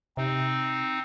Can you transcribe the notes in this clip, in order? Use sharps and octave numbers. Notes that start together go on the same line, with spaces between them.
C3 C4 D#4